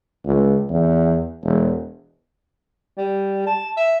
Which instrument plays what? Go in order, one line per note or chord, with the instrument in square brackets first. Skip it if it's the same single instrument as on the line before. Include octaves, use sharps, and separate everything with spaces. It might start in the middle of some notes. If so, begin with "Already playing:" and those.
[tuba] C#2
E2
E1
[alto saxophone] G3
A5
E5